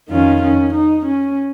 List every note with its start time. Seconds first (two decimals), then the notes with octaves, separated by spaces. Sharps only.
0.10 F2 D#3 C#4 F4
0.42 C#4
0.74 D#4
1.06 C#4